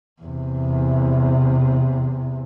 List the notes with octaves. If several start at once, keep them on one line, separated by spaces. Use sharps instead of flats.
E2 C3